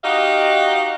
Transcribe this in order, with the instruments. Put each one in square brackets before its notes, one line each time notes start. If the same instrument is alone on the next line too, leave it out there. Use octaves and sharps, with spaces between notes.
[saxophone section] D#4 F#4 G4 D#5 F5